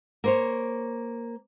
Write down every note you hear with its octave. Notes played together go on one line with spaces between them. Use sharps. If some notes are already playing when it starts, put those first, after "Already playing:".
A#3 C5 C#5